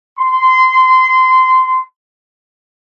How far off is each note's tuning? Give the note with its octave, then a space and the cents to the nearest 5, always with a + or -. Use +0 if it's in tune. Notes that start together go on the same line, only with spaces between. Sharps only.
C6 -20